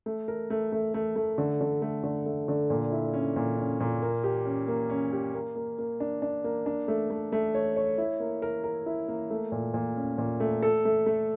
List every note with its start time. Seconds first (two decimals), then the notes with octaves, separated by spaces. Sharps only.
0.06 A3
0.28 A#4
0.50 A3
0.72 A3
0.94 A3
1.16 A3
1.38 D3
1.61 D3
1.82 A3
2.03 D3
2.26 A3
2.48 D3
2.70 A#2
2.92 E4
3.14 C#4
3.36 A#2
3.58 C#4
3.80 A#2
4.02 A#3
4.24 G4
4.46 C#4
4.68 A#3
4.90 C#4
5.12 G4
5.34 A#3
5.56 A#3
5.78 A#3
6.00 D4
6.22 D4
6.44 A#3
6.66 D4
6.88 A3
7.10 A3
7.32 A3
7.54 C#5
7.76 C#5
7.98 E4
8.20 A#3
8.42 A#4
8.64 A#4
8.86 E4
9.08 A#3
9.30 A3
9.52 A#2
9.74 A#2
9.96 C#4
10.18 A#2
10.40 A3
10.62 A4
10.85 A3
11.06 A3